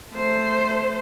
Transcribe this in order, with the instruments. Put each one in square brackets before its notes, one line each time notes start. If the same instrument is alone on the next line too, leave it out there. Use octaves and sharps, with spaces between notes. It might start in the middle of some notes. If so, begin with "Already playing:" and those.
[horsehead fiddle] A3 C5